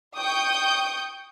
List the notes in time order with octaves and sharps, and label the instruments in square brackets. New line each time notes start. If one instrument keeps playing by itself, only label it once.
[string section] G5 C#6 D#6 G6